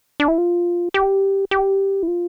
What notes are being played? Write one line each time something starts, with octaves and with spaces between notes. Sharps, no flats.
D4
E4
F4
G4
G4
E4
F4